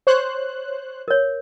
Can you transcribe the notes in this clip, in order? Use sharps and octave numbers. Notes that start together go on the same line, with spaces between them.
C5 C#5 F#6
A#4 C#5